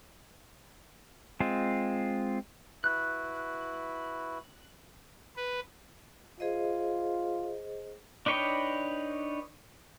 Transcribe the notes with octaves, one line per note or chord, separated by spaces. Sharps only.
G#3 C4 F4
E4 F#4 B4 F#6
B4
F4 G#4 C5 D#5
D4 D#4 B4 C#5 G5